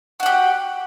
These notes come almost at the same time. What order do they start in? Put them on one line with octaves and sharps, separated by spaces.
F#4 F#5 G4